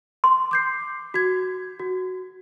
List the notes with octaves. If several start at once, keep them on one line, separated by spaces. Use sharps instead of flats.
C6
D6 G6 C7
F#4 G#6
F#4